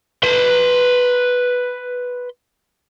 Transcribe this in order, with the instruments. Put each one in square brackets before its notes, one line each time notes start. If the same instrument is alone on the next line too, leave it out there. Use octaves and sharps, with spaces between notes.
[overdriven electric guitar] B4 C6